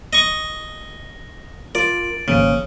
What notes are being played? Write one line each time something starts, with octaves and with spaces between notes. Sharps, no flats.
D#5 C#6
F4 A#4 D5
G#1 C#3 F3 A#3